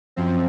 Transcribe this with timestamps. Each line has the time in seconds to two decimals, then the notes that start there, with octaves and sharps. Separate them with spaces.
0.16 F#2 F3 C4